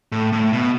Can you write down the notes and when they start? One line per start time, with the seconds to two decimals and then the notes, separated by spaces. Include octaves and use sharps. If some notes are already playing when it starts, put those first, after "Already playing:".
0.12 A2
0.32 A2
0.53 B2